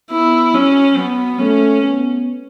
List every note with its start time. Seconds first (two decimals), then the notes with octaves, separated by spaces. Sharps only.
0.11 B3 E4
0.54 F#3 C#4
0.97 F#3 B3
1.39 A3 C#4
1.83 B3